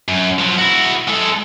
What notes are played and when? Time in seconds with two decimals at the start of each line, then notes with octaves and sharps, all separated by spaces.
0.08 F#2
0.39 F3 F#3
0.59 E4 F#4
1.08 G#3 A4